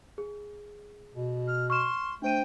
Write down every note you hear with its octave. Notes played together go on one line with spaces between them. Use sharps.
G#4
B2
F6
C6 C#6 F6 E7
A3 D4 C5 G5 D#7